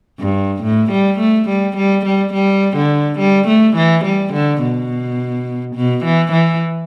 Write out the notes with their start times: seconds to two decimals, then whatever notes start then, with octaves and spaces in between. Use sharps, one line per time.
0.20 G2
0.63 A2
0.91 G3
1.19 A3
1.49 G3
1.77 G3
2.06 G3
2.33 G3
2.77 D3
3.19 G3
3.48 A3
3.76 E3
4.05 G3
4.33 D3
4.62 B2
5.76 B2
6.05 E3
6.32 E3